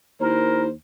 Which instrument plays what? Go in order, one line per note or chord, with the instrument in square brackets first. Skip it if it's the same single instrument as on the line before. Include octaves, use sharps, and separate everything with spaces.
[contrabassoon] D#2 [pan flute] E4 [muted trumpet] A#4 [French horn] C5